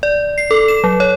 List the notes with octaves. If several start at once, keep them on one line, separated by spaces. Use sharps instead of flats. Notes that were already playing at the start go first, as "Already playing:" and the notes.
D5
C7
A4
E7
F#3
C#5